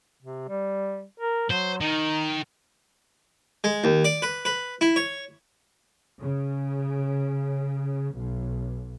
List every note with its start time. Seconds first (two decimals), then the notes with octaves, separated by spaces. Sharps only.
0.22 C3
0.48 G3
1.20 A#4
1.50 F#3 C5
1.81 D#3 D#4
3.64 G#3
3.84 D#2
4.05 D5
4.22 B4
4.45 B4
4.81 E4
4.96 C#5
6.21 C#3
8.16 B1